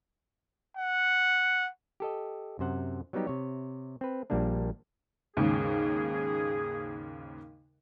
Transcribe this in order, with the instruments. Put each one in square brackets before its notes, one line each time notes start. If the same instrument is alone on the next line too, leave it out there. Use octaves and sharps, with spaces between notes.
[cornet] F#5
[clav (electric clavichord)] G4 A4 D#5
F#2 C3 C5 F#5
F#3 G3 B3 D#4 G4
C3 C#5
C4 B4
A#1 A#2 G3 A#3 D4
[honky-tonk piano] D#2 G#2 C#3 [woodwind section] G#4